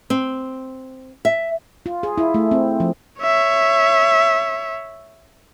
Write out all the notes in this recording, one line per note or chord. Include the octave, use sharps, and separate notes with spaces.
C4
E5
F4
G#4
E4
A3
C4
F3
C#5 E5